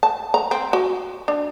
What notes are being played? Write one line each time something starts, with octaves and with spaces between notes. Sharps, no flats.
A5
A#5
C4
F#4
D4